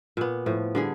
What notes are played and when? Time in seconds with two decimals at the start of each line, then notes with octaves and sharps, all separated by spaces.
0.17 A#2 B3
0.46 A2 F3
0.75 D3 G3 G#4